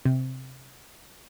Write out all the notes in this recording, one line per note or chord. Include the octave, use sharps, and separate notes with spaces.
C3